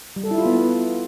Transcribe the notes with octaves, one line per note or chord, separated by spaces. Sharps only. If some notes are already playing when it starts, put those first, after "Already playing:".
G3
A4
E4
F4
B3